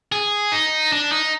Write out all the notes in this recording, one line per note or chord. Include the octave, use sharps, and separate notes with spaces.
G#4
D#4
D4
D#4